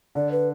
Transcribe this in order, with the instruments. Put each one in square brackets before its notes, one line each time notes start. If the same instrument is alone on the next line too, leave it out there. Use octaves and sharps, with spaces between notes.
[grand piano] D3 [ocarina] D5
[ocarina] B4